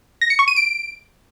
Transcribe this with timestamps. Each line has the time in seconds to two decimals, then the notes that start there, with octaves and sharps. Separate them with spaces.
0.21 A#6
0.30 C#7
0.39 C#6
0.48 D#7
0.56 D7